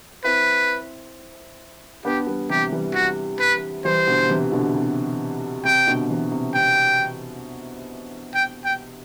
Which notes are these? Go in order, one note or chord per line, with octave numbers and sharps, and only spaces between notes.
C4 E4 B4
B3 D4 G4
G3 B3
C3 E3 G4
E3 G3
F#4
B4
E3 G3 C5
B2 D3
C3 E3
B2 D3
C3
C3 G5
B2 D3
C3 E3
C3
C3 G5
G5
G5